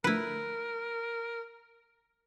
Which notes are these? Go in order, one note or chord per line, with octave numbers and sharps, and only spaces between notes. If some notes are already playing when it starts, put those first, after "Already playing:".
D3 F3 A3 E4 A#4 B4